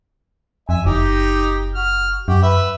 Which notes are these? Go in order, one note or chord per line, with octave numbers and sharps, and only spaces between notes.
F2 E5 G#5
F#1 D#4 G4
F#4 F6
F#2 F#4 G4
B4 E5